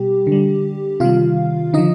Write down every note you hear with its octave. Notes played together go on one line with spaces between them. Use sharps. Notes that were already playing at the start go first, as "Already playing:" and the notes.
Already playing: B2 G3 G4
D3
G3
C3 D#3 G3 F4 F5
D3 F3 D#4 D#5